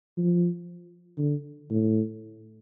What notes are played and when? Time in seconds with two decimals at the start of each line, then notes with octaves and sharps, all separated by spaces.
0.17 F3
1.18 D3
1.70 A2